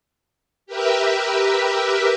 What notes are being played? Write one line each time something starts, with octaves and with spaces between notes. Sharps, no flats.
G4 A#4 B4 E5